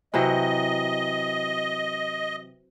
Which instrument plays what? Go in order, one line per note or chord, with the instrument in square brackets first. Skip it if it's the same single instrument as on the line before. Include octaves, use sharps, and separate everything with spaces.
[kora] C3 E3 F#3 [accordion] D#5